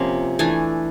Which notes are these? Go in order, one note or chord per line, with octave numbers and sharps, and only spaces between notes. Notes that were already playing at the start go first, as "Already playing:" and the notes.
Already playing: C3 F3 A#3 C#4
E3 A3 D4 G#5